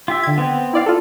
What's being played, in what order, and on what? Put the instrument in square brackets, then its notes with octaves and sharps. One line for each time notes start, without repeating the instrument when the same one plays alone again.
[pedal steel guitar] F4 G4 E5
[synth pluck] D3 G#6
[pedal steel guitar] B3 C4
[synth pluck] E4 D5 F5
F4 A4